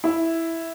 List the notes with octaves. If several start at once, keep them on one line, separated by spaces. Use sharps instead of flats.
E4